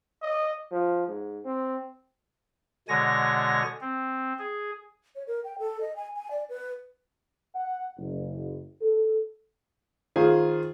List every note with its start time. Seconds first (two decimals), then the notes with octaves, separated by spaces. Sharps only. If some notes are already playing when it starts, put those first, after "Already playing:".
0.22 D#5
0.72 F3
1.08 G#2
1.45 C4
2.89 B2 D3 G#3 C#5 G#5 A#6
3.81 C4
4.39 G#4
5.15 C#5
5.27 A#4
5.44 G5
5.59 A4
5.81 D#5
5.96 G#5
6.15 G#5
6.31 D5
6.49 B4
7.55 F#5
7.98 F#1
8.82 A4
10.16 D#3 F4 G#4 C5